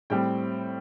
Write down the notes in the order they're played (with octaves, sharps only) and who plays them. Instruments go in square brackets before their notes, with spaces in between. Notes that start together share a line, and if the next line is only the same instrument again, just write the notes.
[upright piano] A2 G3 C4 G5